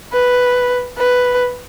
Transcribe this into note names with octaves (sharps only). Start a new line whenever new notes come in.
B4
B4